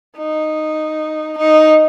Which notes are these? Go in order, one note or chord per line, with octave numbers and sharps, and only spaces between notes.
D#4
D#4